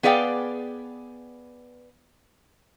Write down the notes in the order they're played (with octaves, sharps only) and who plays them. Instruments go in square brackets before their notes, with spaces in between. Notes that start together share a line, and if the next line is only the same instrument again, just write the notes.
[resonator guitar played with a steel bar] B3 G#4 B4 D5 F5 G5